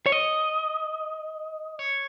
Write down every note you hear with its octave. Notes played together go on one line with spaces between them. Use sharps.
C#5
D#5
C#5